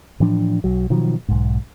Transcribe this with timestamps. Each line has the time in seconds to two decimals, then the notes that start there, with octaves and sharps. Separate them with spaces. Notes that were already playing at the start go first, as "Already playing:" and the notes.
0.20 A2 E3 F3 D4
0.64 B1 F#3
0.90 B2 D#3 F3 F#3
1.29 B1 G#2